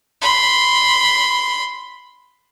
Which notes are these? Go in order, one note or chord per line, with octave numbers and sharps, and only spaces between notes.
B5 C6